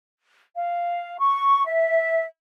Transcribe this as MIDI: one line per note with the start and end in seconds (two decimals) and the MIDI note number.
0.55 1.17 77
1.20 1.66 85
1.68 2.25 76